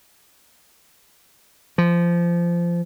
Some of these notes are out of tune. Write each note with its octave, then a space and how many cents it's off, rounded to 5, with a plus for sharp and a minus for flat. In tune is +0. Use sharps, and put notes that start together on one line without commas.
F3 -20